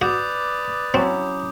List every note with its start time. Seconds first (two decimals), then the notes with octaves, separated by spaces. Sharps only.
0.02 F#4 B4 D5 D6 D#6 G6
0.94 F#3 C4 C#4 E4